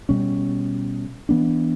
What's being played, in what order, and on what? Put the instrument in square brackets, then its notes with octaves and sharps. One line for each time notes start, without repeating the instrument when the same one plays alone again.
[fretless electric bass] B2 G3 C#4
E3 B3 D4